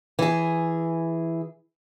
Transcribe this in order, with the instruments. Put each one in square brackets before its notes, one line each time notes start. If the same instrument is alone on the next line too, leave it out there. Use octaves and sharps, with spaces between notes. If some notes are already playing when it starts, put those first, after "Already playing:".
[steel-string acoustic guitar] E3 G#4